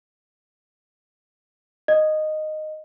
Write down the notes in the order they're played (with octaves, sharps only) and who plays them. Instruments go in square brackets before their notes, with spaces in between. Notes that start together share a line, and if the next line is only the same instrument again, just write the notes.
[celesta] D#5